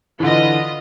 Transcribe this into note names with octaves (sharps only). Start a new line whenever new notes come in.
D3 E3 F4 B4 D#5